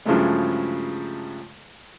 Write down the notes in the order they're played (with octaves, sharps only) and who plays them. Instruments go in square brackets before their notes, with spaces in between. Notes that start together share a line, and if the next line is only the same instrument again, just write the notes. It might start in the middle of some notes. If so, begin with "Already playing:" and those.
[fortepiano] G2 C#3 F3 F#3 G#3 A3